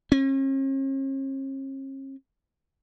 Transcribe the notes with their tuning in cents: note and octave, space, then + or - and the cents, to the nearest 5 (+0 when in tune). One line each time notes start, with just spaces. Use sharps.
C#4 -45